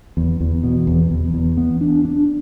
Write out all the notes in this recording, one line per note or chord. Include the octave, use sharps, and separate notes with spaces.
E2
E2
B2
E2
E2
E2
B3
D4
D4